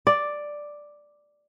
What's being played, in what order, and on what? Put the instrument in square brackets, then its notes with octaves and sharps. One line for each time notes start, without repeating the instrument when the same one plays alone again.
[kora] D5